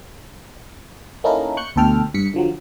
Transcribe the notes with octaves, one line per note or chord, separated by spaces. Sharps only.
A#3 C#4 D#4 E4 A4 A#4
C#6 F#6 G6 C#7
D2 B2 A4 G5 F6
G2 B6 C#7
D3 F3 F#3